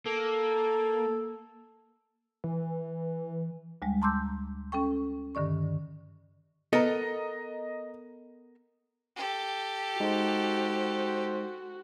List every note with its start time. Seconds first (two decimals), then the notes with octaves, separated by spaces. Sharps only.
0.06 A#3 A4
2.44 E3
3.82 D2 G3 G#3
4.02 A5 A#5 C6 D6 E6 G6
4.72 C#4 A4 G5 C#6
5.35 G2 D3 D#3 D5 C#6
6.73 B3 A4 A#4 D#5 A#5
9.16 G4 A4
10.00 G#3 D#4 F#4 C5